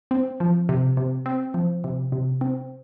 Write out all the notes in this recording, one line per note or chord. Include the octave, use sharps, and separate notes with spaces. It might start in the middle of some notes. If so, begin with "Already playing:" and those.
C4
F3
C3
C3
C4
F3
C3
C3
C4